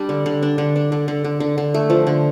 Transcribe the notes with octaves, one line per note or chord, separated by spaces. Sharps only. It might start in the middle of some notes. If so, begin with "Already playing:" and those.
Already playing: G3 D4
D3
D3
D4
D3
D4
D3
D3
D3
D3
D3
A3
F3
D3